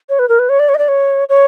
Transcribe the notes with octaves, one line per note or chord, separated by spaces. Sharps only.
C#5
B4
A#4
B4
C#5
D5
C#5
D#5
D5
C#5
C#5